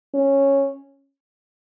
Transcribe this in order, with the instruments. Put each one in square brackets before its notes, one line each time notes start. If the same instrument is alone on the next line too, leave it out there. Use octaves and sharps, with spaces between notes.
[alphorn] C#4